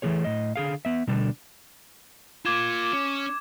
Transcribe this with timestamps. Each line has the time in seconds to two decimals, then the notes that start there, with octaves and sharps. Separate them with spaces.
0.02 E3 A3 A#3 G#4 C#5
0.24 A2 D#5
0.56 D3 G#4 F5
0.85 B3 E5
1.07 B2 D3 G3 D4
2.45 A#3 F4 D6 G#6 E7
2.93 C#4